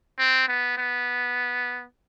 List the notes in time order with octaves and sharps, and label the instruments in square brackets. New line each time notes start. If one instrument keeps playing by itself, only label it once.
[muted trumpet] C4
B3
B3